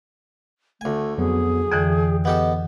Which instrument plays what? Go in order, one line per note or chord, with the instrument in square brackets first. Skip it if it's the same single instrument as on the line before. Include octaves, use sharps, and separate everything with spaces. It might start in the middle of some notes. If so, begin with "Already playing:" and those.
[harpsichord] D2 G#5 [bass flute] A3
[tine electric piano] F2 F#3 B3 [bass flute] G#4
[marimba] F2 D3 E3 [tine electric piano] G5
[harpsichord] B3 G4 A4 [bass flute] D#5